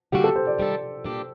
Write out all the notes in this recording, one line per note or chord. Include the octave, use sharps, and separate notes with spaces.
D3 G3 A#3 D4 F#4 G4
A4
C5
D5
D#3 G3 D4 A4
A#2 G3 D4 G4